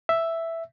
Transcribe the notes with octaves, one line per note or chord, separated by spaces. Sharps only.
E5